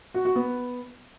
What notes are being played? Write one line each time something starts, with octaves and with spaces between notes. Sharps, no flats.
F#4
F#4
B3